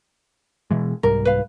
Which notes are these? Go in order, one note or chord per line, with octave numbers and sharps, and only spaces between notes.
B2 E3 G#3
C2 G#2 G3 A#4
B4 F5